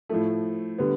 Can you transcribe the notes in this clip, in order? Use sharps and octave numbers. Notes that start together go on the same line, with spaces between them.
A2 F3 A3
D3 G3 B3